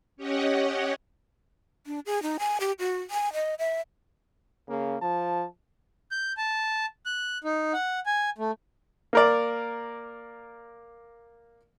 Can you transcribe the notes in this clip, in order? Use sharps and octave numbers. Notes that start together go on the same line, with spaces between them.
C#4 G4 C#5 D#5 F#5
D4
G#4
D#4
G#5
G4
F#4
G#5
D#5
E5
C#3 A#3
F3 A5
G6
A5
F#6
D#4
F#5
G#5
A3
A#3 A#4 D5